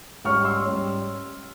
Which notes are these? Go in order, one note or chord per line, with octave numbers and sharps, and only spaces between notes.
G#2 G3 C#4 C#6 F6
C6 E6
G#2 G3 C#4